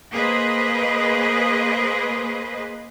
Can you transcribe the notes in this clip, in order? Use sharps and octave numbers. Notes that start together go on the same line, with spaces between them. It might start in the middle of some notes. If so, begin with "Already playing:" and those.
A#3 G#4 B4 C5 D#5